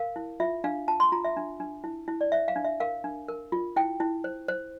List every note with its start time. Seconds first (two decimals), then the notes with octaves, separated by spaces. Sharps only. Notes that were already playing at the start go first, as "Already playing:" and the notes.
Already playing: A#4 F5
0.16 E4
0.40 F4 E5
0.64 D4 F5
0.88 F4 A5
1.00 C6
1.12 F4 A#5
1.25 E5
1.37 D4
1.60 D4
1.84 E4
2.08 E4
2.21 D5
2.32 C5 E5
2.48 F5
2.56 D4
2.65 E5
2.80 A#4 F5
3.04 D4
3.28 A#4
3.52 F4
3.76 E4 G5
4.00 E4
4.24 C5
4.48 C5